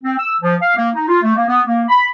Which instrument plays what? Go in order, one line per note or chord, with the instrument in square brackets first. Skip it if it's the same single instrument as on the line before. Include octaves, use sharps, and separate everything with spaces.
[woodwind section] C4
E6
F3
F5
A#3
D#4
F4
A3
A#3
B3
A#3
B5